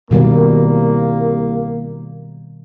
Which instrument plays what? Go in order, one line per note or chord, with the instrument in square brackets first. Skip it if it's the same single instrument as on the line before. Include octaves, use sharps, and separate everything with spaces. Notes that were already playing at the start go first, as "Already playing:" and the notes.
[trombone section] C2 A#3 [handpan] B2 D#3 G3